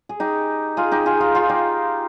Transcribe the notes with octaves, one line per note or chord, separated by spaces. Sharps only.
G#4
D#4 G4
F4 G#4
D#4 G4
F4 G#4
F4 G#4
F4 G#4
D#4 G4